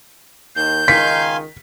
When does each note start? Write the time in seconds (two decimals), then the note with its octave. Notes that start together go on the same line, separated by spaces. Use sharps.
0.56 D#2 D#3 G6
0.88 C#2 D#3 F5 G#5 C6 B6